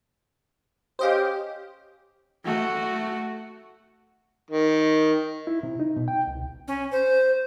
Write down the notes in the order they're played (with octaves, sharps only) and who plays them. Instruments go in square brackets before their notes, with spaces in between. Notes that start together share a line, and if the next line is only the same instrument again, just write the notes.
[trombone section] C#4 G4 [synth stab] C5 D#5 F5
[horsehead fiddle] A3 F#4
[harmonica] D#3
[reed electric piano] E4
C3
D#4
B2
G5
C2
[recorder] C#4
C5